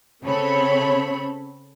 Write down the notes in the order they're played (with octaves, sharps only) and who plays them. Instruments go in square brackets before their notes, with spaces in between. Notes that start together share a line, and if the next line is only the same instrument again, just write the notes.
[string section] C#3 C4 A4 C#5 B5